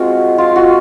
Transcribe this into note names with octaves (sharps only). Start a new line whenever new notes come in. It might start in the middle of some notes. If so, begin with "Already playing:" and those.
Already playing: G#3 C4 F4 F#4
F4
F#4